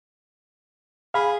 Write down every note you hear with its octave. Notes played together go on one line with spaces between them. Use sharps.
G#4 F5 B5